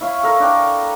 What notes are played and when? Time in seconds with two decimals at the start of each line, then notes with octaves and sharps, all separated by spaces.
0.01 E4 C#5 F5
0.23 A4 A#4
0.40 D4 G5 C#6 D6